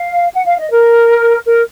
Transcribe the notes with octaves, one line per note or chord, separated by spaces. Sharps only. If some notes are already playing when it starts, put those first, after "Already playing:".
Already playing: F5
F#5
F5
D#5
A#4
A#4